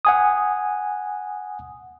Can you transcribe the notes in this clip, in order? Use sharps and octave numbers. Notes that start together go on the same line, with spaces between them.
F#5 G#5 D#6